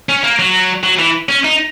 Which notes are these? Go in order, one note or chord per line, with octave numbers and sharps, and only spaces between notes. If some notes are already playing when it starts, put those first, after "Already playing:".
C#4
A#3
F#3
F#3
E3
C#4
D#4